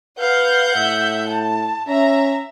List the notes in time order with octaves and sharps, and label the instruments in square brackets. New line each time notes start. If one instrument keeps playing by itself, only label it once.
[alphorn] B4 [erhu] F5 [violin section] F#5 G6
[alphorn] A2 [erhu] E5
[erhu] A5
[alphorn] C#4 [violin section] E5 [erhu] A#5